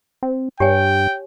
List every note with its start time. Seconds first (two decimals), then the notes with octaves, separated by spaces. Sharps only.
0.23 C4
0.60 G2 G4 C#5 G5 G#5